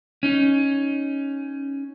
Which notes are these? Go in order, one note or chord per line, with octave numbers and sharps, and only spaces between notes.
C#4 D#4